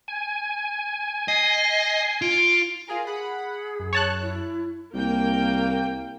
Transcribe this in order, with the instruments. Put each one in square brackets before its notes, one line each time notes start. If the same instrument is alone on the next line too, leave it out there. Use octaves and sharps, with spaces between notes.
[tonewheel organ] G#5
[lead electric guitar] D#5 [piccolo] C7
[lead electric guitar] F4 [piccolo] D7
[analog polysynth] F4 G#4 A#4 [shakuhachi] G#5
[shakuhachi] G#4 [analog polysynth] F#5 B5
[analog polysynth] F#2
[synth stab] C#5 A5 F#6
[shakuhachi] E4
[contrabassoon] C2 [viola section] A#3 G5